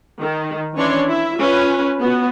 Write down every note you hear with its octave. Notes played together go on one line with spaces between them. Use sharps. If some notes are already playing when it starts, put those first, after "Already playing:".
D#3
E3 C#4 D4 C#5 D5 C6
E4 E5
C#4 F4 B4
B3 F#4